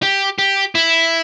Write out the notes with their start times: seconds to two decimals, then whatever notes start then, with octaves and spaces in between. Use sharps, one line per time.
0.03 G4
0.39 G4
0.75 E4